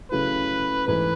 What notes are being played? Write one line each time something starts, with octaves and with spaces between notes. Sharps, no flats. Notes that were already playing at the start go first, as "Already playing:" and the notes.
C#3 F#3 A3 E4 B4
G#2 E3 A3 E4 B4